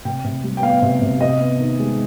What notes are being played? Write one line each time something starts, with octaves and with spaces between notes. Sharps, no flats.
C3 G5
C3
G3
G5
B3 F5
C3
C3
C3 D#5
B3
D#3
G#3